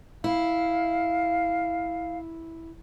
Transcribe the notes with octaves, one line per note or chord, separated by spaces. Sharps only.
E4 F5